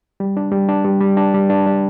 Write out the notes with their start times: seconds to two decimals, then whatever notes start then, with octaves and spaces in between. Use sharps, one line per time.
0.20 G3
0.37 D4
0.52 G3
0.69 D4
0.85 G3
1.01 G3
1.17 D4
1.34 G3
1.50 D4
1.67 G3